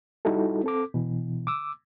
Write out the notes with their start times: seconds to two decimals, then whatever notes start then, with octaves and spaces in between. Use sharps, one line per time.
0.25 G3 D#4 E4 F#4 A4
0.64 C4 A4 D6
0.94 B2 E3
1.47 D6 E6